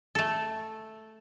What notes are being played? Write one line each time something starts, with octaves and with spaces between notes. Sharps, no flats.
A3 A4